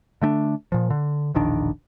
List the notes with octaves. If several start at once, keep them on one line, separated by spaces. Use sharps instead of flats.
D3 A3 C4 D4
A#2 F3
D3
E1 A#1 D#3 D4